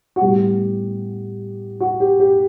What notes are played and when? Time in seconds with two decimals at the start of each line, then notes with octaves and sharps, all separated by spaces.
0.16 F#4
0.21 A2 G3 B3 G4
1.80 F#4
2.00 G4
2.20 G4